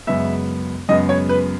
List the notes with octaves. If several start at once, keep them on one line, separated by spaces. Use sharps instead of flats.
F#2 C#3 G#3 B3 E5
F#2 C#3 G#3 B3 D#5
C#5
B4